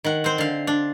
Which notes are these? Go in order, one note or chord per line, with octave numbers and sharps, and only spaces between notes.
D#3 F#5
C4 C5
D3 F5
D4